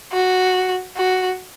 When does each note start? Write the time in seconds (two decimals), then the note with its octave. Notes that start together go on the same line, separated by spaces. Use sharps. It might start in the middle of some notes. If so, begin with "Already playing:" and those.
0.13 F#4
0.96 F#4